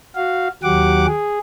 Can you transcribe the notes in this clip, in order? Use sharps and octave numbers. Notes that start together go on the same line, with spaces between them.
F#4 F5
D#2 F#3 G4 F#5 D6
G#4